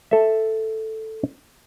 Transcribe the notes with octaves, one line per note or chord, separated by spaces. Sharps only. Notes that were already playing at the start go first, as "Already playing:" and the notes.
A4 E5